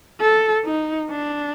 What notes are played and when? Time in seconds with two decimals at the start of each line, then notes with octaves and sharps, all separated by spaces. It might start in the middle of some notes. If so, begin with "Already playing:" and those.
0.21 A4
0.65 D#4
1.10 D4